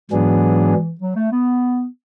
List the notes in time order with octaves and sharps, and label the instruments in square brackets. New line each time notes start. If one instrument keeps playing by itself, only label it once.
[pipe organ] G#2 F#3 B3 D4 G#4 [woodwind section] E3
[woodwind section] F#3
A3
B3